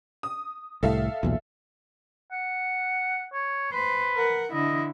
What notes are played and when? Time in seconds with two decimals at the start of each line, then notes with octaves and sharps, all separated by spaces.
0.23 D#6
0.83 C2 A2 A4 E5 F5
1.23 B1 E2 A#2
2.32 F#5
3.33 C#5
3.72 B4 C5
4.16 A#4 F#5
4.53 D3 E4 D#5